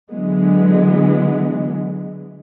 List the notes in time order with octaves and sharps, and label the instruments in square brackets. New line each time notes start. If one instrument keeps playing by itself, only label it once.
[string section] D3 E3 F#3 G#3 B3